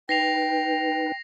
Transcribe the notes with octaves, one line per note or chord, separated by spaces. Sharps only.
D#4 B4 G5 A#6 C7 F7